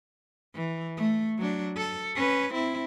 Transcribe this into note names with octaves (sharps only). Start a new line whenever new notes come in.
E3
A3
F#3 D4
A4
C#4 B4
C4 E4